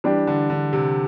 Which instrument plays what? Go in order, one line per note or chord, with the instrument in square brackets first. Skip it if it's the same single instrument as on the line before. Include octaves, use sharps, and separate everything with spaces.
[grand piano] E3 [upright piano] G3 D4 G4
[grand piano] D3
D3
C3